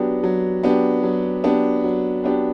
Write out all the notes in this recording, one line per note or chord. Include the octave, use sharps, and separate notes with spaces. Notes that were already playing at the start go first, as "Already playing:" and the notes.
Already playing: F#3 B3 D4 G4
F#3
B3 D4 G4
F#3
B3 D4 G4
F#3
B3 D4 G4